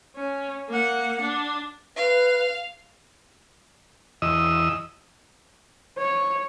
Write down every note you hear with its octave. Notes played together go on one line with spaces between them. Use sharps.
C#4
A#3 F#5
D4
B4 F5
E2 D#5 E6
C#5